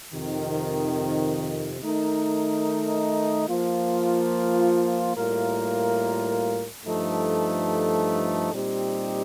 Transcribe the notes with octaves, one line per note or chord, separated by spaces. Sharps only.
F2 C3 D#3
D#3 A3 D#4 A#4
F3 A#3 F4
A2 G3 A#3 F4 A#4
G2 F3 A3 D#4 A4
A#2 G3 C4 D#4 G4